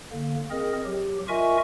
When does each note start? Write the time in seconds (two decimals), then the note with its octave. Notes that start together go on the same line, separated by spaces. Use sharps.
0.12 D3 A#3
0.50 C4 G#4 A#4 D#5
0.85 F#3 G4
1.28 F4 A#4 D#5 E5 G#5 C#6